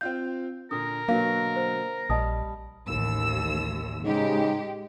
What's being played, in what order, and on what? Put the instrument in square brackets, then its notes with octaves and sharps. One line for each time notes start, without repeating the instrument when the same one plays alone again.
[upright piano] C4 F4 F5 [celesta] G6
[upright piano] A#2 D3 [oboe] A#4 [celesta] D#6
[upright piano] B2 D3 F#3 [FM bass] A#3 [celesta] F5
[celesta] C5
[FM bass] A#1 [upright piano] G3 [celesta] D#5 A5 D#6
[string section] A1 D#2 E6
[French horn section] G#2 C#3 D#4 [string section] G#3 G4